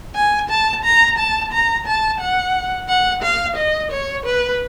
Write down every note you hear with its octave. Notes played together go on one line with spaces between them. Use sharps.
G#5
A5
A#5
A5
A#5
A5
F#5
F#5
F5
D#5
C#5
B4